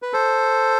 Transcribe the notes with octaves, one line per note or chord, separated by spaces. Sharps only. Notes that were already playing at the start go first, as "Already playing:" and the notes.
B4
A4 C5